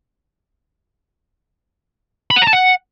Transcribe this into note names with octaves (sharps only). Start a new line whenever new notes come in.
B5
F#5
A#5
A5
F#5